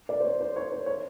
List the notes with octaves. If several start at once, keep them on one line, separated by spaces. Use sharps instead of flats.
D5
C5
C#5
C5
C#5
C5
C#5